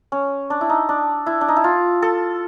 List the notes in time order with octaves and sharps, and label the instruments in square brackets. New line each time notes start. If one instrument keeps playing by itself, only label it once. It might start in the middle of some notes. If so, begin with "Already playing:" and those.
[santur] C#4
D4
E4
D#4
D4
E4
D4
D#4
E4
F4
A4